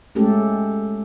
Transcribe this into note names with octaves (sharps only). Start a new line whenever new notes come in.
G#3 A3 C#4 G4 A4